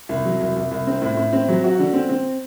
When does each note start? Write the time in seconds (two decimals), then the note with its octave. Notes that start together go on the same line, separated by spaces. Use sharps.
0.09 C2
0.25 F#3
0.40 C2
0.56 C2
0.71 C2
0.87 C4
1.02 A2
1.17 A2
1.33 C4
1.48 F#3
1.64 F#4
1.79 D3
1.94 C4
2.09 C4